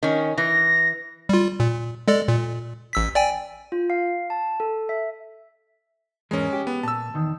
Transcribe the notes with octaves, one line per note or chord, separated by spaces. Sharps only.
D#3 C#4
E3 A#6
G3 F4
A#2
G#3 A4 D5
A#2
A1 E6 B6
D5 G5 G#5
F4
F5
A5
A4
E5
E2 G#2 G#3 C#4 A#4
G4
B3
A#2 A5 E6
E2 D#3